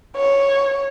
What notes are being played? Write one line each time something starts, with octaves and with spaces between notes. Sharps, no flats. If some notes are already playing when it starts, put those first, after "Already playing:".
C#5